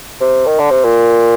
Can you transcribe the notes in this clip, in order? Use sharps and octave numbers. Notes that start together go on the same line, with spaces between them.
C3
D#3
D3
C3
A#2